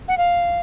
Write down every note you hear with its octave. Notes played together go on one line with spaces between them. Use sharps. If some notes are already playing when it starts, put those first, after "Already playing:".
F#5
F5